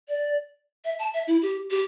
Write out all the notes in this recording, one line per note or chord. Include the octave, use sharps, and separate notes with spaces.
D5
E5
A5
E5
E4
G4
G4